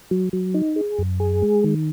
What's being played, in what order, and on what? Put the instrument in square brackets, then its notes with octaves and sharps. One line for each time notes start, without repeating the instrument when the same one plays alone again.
[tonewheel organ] F#3
F#3
D#4
G#4
F#2
G#4
G#3
D#3